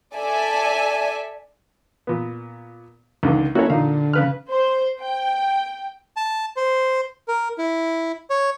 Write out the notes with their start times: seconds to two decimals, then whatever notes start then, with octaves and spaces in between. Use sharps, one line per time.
0.15 A4 D5 E5 G#5
2.07 A#2 B3
3.23 C#2 D3 D#3
3.55 A#3 C#4 E4 F#4 A4 C#5
3.70 A#2 D3 D#4 F5
4.13 C#3 B4 F6
4.49 C5
5.01 G5
6.17 A5
6.57 C5
7.28 A#4
7.58 E4
8.30 C#5